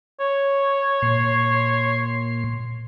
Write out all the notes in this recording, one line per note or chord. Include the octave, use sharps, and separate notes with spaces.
C#5
A#2 C6